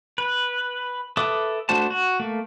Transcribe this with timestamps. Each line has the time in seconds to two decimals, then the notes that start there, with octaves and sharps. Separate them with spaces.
0.18 B4
1.17 A4 B4 E5 D6 D#6
1.69 A3 D4 F#4 C5 A5
1.90 F#4
2.20 A3 A#3